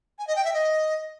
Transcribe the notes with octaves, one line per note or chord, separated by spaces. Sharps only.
G#5
D#5
G5
E5
D#5